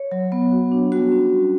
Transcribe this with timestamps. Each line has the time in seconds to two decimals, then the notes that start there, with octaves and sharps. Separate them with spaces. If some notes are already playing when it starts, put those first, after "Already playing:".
Already playing: C#5
0.12 F#3
0.32 B3
0.52 F#4
0.72 D4
0.91 G3 F#4
1.12 C#4
1.33 G3